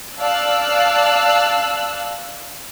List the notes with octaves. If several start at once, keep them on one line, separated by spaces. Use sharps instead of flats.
D5 F5 A5 E6 F#6